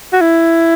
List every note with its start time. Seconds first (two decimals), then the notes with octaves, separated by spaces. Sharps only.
0.13 F#4
0.21 E4